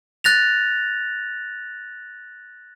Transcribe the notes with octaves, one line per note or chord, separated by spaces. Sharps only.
F#6 A6 A#6 F7